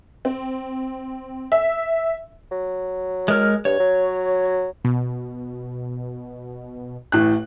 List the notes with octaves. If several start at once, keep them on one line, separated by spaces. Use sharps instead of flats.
C4
E5
F#3
G#3 A#4 F6
G2 C#5
F#3
B2
A1 A2 F#6